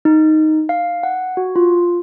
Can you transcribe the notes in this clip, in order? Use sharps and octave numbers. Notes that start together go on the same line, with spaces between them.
D#4
F5
F#5
F#4
F4